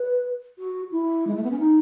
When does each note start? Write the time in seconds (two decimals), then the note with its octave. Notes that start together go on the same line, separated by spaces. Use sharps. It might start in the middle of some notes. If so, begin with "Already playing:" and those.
Already playing: B4
0.59 F#4
0.92 E4
1.27 G#3
1.36 A3
1.44 B3
1.51 C#4
1.59 D#4